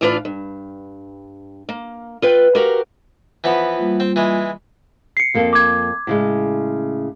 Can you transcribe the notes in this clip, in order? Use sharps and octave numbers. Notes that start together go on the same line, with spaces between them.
A2 E3 D4 F4 B4 F5
G2
A#3
F4 B4 G5
F#4 G4 A#4 F5
E3 F3 B3
G3 A#3 F4
C4
E3 G#3
C7 C#7
F2 A#3 A4
D6 G#6
A2 C#3 G#3